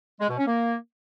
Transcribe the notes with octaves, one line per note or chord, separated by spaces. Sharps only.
G#3
B2
C#4
A#3